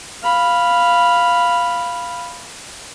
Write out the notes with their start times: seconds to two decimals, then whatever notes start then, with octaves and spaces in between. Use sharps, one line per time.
0.23 F5 B5